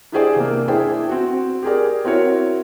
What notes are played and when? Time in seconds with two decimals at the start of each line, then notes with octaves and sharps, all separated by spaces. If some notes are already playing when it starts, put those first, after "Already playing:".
0.12 D4 E4 G4 G#4 C5 D5
0.36 C3 A#3
0.68 D4 E4 G#4 C5 G5
1.09 C4 F#4
1.63 G4 G#4 A#4 D5
2.05 C4 E4 F#4 A#4 C#5